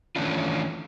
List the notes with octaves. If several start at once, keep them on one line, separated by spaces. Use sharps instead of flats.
D#3 E3 A3 C#4 D4 F4